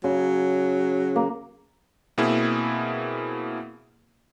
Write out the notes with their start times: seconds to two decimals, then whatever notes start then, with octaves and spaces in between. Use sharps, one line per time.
0.04 C#3 F#3
1.16 A#3
2.18 B2 A#3 C4 E4 G#4